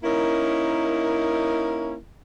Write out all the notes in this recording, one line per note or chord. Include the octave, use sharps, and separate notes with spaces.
A#3 C#4 D#4 E4 A#4